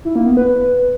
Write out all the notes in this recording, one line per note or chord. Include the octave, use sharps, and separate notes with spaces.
E4
A#3
B3
B4